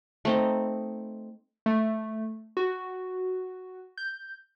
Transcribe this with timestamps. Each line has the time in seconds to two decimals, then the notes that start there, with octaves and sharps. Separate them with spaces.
0.25 A3 C4 D#4
1.66 A3
2.57 F#4
3.97 G6